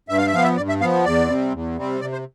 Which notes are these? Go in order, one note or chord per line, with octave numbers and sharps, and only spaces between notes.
G2 E5
F5
E5
F3 B3 F5
E5
G2 D5
E5
F3 B3 F5
E2 D5
C3 G3 C4
E2
C3 G3 C4
C3 D5
C5